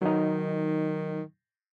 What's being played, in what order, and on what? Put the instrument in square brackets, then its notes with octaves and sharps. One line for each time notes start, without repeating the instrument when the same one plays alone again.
[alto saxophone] D#3 [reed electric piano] F#3 D#4